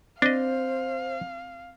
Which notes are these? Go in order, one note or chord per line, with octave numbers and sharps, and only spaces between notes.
C4 D4 C5 D#5 F5